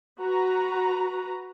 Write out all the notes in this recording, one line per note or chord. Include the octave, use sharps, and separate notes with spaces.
F#4 B4 A#5